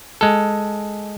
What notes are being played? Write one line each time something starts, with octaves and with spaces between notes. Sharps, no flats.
G#3 A4